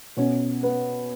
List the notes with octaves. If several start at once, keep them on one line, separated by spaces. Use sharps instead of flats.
B2 C#4
B3